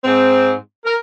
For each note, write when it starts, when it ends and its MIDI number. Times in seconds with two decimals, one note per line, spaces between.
0.04 0.54 44
0.04 0.54 60
0.85 0.95 70